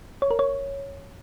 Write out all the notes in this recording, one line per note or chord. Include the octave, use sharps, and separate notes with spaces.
C#5
A#4
C#5